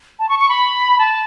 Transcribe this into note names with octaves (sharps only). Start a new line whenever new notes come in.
A5
C#6
C#6
B5
A5